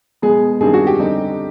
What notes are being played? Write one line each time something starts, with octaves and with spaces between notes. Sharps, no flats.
B2 G#3 B3 G#4
G2 D#3 G3 C4 G#4
F#4
G4
D3 G3 C4 D#4